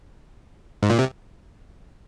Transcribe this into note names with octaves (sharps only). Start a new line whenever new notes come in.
G#2
A#2
C3